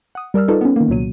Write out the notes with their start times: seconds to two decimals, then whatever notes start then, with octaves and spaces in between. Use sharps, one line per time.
0.15 F#5 D#6
0.34 G3 A#4 D5 E6 F6
0.48 D#4 F4 A4 B4 D5 D#5
0.61 B3 C#4
0.76 D#3 A#3
0.88 C2 A#2 F#3 D#7